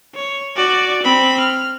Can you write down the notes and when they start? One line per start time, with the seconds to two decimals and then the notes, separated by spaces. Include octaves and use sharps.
0.15 C#5
0.56 F#4 D5
1.03 C4 B5
1.40 F6